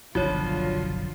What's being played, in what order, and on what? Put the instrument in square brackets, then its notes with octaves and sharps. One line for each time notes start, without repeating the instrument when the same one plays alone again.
[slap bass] F#1 B1 F#2 [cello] D3 F4 [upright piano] F3 [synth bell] F#4 C#5